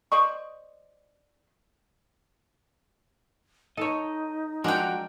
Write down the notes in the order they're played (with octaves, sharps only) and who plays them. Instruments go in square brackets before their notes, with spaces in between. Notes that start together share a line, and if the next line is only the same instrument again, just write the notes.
[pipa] C5 D5 D#5 C#6
[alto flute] D#4 [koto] A4 C#5 [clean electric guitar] D#5
[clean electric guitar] F3 F#4 [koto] G#3 D4 A#5 [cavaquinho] A#4 G5